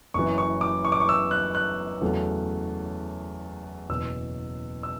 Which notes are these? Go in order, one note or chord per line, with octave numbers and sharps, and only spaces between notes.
F#1 F#2 E3 C#6
C#6
D6
C#6
D6
C#6
E6
F#6
F#6
E2 C#3 F#3 A3
F#1 E2 B2 E6
E6